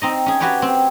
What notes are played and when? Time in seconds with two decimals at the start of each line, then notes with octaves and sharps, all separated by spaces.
0.02 C4 D#4 D#5
0.26 C#4 G#4
0.40 F#4 G4 B4 C#5 G5
0.62 C4